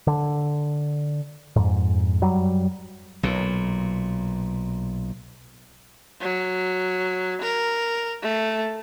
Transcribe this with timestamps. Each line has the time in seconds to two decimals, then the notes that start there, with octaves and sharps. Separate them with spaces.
0.07 D3
1.56 F2 G#2
2.22 F#2 F#3 G3
3.23 B1 A#2
6.21 F#3
7.41 A#4
8.22 A3